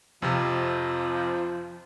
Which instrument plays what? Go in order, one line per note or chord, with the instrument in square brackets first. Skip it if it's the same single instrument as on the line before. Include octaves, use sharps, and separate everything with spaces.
[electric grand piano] F2 C3 [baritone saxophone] F3